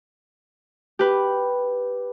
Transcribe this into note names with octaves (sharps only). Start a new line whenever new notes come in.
G4 B4